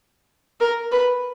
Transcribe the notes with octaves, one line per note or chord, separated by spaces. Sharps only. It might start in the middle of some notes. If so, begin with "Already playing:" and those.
A#4
B4